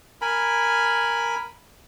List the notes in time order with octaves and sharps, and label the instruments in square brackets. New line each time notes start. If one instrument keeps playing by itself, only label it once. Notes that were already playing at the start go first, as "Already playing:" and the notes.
[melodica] A#4 G#5 B5